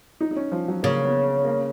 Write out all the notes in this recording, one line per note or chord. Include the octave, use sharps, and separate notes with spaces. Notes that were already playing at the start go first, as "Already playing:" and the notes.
D#4
D#4
C#4
F3
F#3
C#3 A#3
B3
A#3